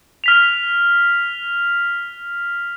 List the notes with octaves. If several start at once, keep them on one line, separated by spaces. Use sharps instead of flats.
F6 B6 F7